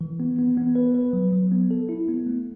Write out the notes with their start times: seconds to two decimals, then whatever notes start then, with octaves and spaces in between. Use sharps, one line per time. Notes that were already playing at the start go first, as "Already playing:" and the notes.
0.01 E3
0.20 B3
0.39 B3
0.57 B3
0.75 B4
0.95 B4
1.13 F#3
1.33 F#3
1.52 B3
1.71 A4
1.89 E4
2.08 B3
2.27 A3